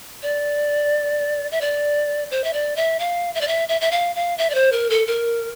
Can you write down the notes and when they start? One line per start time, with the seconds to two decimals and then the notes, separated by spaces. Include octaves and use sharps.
0.23 D5
1.52 E5
1.61 D5
2.31 C5
2.44 E5
2.53 D5
2.76 E5
3.00 F5
3.35 E5
3.41 D5
3.48 E5
3.69 E5
3.81 E5
3.91 F5
4.15 F5
4.38 E5
4.50 D5
4.55 C5
4.72 A#4
4.90 A4
5.07 A#4